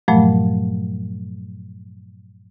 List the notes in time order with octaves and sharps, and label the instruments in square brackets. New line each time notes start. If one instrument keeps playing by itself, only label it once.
[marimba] G2 A#2 F3 F#3 A3